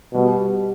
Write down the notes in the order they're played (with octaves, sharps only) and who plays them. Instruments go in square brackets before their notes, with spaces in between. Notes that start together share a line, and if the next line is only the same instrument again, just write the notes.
[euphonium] B2 [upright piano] G3